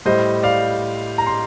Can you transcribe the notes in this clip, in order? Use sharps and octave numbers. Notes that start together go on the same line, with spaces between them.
A2 G3 C5 D#5
D5 F5
A#5
C6